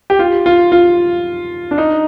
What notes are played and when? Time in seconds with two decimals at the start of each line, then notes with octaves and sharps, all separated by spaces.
0.10 G4
0.19 F4
0.46 F4
0.72 F4
1.71 D4
1.78 D#4